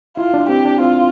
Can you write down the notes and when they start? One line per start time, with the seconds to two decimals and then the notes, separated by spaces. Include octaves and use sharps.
0.17 E4 F4
0.34 D4
0.49 C4 G4
0.65 D4
0.80 C4 F4